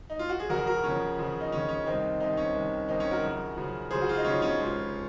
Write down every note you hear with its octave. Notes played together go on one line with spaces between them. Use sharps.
D#4
F4
F#4
G#4
F2 C#3 F3 F#4 A#4
F#4 A#4
F2 C#3 F3 C#4
F2 C#3 F3
D#4
F2 C#3 F3 C#4
C#4
C2 C3 D#3 C4 D#4
C2 C3 D#3 C4 D#4
C#4
C2 C3 D#3
C2 C3 D#3 C4 D#4
C#4
F#4 A#4
F#2 C#3 F3
F#2 C#3 F3
F#2 C#3 F3 G#4 C5
F#4
F4
D#4
F#2 C#3 F3 C#4
C#4 F4
C#2 C3 F3